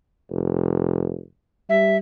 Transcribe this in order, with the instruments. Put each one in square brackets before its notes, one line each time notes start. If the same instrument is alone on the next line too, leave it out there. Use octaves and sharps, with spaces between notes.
[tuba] F1
[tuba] G3 [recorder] E5